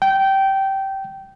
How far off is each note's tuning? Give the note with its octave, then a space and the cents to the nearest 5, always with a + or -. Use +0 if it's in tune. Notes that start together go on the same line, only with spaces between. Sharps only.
G5 -15